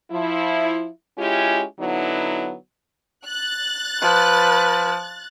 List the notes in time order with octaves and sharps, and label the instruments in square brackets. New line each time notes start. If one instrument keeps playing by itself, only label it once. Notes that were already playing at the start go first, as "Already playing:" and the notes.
[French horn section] F3 E4
G#3 C#4 E4 F4 G4
D3 F#3 B3 D#4 E4
[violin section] F#6 A6
[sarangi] F3 [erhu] B4